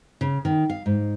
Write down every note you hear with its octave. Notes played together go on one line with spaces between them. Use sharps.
C#3
D#3
F5
G#2